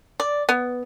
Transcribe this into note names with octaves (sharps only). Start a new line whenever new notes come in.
D5
B3